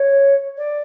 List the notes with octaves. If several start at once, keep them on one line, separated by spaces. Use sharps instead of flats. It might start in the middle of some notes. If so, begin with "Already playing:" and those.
Already playing: C#5
D5